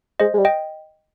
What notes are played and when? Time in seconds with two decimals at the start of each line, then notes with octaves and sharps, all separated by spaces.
0.20 G#3 C5 D#5
0.34 G#3
0.38 G3
0.45 D#5 G5